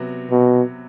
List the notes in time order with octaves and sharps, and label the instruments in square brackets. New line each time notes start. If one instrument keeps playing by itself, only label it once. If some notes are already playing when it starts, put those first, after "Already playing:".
Already playing: [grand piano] C3 F#3 B3
[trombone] B2